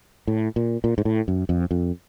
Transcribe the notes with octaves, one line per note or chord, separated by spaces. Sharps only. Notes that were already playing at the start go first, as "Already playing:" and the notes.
A2
A#2
A#2
G#2
A2
F#2
F2
F2